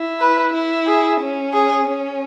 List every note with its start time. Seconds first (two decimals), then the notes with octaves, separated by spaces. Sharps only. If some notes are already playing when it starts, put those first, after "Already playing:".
Already playing: E4
0.20 B4
0.53 E4
0.87 G#4
1.20 C#4
1.53 G#4
1.86 C#4